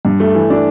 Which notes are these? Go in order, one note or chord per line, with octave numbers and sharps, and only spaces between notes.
G2
A3
E3
D4